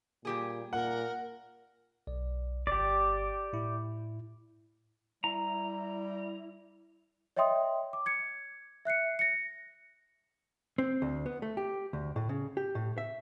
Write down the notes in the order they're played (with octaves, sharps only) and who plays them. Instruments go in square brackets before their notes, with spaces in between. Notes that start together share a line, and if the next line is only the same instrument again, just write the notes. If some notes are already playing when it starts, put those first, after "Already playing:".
[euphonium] A#2 [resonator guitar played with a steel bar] G3 G4 G#4
[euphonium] A#2 [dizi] A#4 [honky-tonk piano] F#5
[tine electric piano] B1 D5
[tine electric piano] G1 [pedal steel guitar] G4 D5
[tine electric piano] A2 E4
[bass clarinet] G3 [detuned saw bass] E4 [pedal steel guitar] A#5
[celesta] C#5 D#5 E5 G5 C6 D#6
D6
G#6 C#7
E5 F#6 C7 C#7
A#6 C#7
[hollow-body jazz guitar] C4
D2
B3
A3
G4
D2
A2
C#3
G4
A2
E5